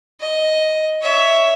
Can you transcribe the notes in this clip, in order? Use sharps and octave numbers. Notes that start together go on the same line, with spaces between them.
D#5
C#5 E5